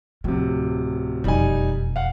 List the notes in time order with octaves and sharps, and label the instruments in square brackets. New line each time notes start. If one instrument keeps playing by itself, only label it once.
[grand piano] D1 C3 [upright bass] F3
[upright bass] E1 F2 [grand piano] G3 D#4 G#5
[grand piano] F5 F#5